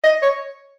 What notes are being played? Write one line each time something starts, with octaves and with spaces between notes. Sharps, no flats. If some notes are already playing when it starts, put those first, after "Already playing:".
D#5
C#5